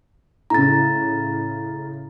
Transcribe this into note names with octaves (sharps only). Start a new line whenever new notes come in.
A2 C#3 A#5 A6